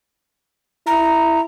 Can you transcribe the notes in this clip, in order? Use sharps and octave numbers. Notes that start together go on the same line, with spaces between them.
E4 A#5